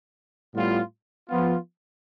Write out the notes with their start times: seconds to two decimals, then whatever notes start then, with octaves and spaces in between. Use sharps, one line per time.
0.54 A2 G3 B3 F4
1.28 F3 B3 F4